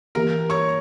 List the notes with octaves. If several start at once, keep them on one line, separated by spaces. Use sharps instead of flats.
E3 A#3 E4 G4 A#4 A#5
C#5 C#6